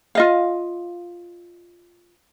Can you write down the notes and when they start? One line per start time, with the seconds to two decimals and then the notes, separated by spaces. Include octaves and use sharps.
0.15 F4 D#5 F5